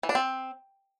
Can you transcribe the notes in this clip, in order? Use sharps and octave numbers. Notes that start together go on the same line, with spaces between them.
E3
D4
C4